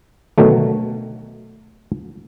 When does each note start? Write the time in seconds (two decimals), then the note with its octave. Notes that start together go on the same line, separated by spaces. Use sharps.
0.38 B2 D3 D#3 F#3 A3